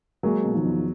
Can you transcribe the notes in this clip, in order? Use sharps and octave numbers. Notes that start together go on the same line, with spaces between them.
F#3 G#3 A#3
B2
D#3 F3
E2